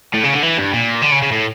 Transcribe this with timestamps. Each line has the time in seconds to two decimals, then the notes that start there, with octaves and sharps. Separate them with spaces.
0.14 A2
0.24 C#3
0.34 D3
0.43 E3
0.58 G2
0.73 A#2
1.02 D3
1.12 C#3
1.22 C#3
1.32 A2